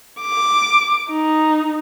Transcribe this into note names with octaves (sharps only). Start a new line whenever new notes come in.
D6
D#4